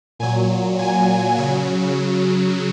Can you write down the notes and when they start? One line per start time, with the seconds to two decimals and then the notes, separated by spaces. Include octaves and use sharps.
0.19 A#2 F#3 G#5
0.79 A#2 F#3 G#5
1.38 C#3 F#3